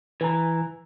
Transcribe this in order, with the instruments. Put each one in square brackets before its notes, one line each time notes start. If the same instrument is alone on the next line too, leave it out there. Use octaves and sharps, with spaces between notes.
[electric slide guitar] E3 [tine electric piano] B4 G#5 A#5